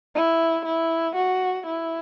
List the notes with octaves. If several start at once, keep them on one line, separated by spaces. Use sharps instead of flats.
E4
E4
F#4
E4